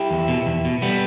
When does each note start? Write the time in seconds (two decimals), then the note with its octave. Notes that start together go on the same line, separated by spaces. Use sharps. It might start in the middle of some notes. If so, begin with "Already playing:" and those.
Already playing: E4 G4
0.11 E2
0.28 B2
0.46 E2
0.65 B2
0.82 G3 B3